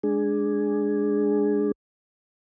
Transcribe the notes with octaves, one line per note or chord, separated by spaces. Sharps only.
G#3 D4 G#4